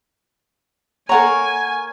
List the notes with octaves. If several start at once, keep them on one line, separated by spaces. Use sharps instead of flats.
A#3 A4 C#5 F#5 G#5 A#5